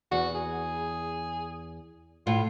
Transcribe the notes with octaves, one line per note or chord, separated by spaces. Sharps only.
E2 F#4
G#4
A2 F4